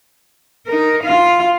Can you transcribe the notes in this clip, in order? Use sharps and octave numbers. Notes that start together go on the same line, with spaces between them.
D#4 A#4
F4 F5